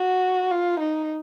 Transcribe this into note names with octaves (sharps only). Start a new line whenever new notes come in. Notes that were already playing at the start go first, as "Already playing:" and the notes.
Already playing: F#4
F4
D#4